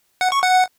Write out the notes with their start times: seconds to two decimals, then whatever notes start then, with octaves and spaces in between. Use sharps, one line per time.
0.21 F#5
0.32 C#6
0.43 F#5